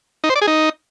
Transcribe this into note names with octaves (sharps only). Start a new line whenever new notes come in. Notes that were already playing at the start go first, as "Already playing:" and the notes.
D#4
C5
D5
G#4
D#4